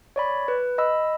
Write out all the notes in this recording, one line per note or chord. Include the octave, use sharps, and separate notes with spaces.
C#5 D5 B5
B4
D#5 B5 E6